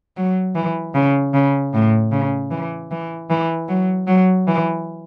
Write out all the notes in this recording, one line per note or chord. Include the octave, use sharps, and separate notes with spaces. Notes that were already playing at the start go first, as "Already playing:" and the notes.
F#3
E3
C#3
C#3
A2
C#3
E3
E3
E3
F#3
F#3
E3